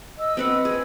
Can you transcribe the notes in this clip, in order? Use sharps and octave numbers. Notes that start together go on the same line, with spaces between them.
D#5 E6
C4 B4 F#5
G#4